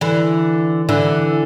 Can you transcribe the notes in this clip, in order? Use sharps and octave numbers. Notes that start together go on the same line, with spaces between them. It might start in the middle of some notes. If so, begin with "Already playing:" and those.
D3 E3
D3 E3